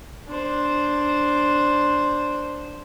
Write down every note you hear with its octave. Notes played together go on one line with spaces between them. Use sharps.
D4 C5